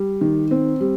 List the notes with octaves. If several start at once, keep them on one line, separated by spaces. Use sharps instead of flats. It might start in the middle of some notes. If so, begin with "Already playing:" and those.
Already playing: G3
D#3
C4
G3